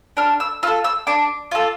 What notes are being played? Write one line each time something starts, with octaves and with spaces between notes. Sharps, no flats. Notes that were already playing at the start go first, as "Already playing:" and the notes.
D4 F6
E6
F4 A4 E6
E6
D4 D6
F4 A4